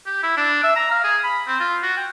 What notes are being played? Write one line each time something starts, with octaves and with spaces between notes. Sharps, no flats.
G4
E4
D4
E5
A#5
F5
G#4
B5
C4
F4
F#4
G5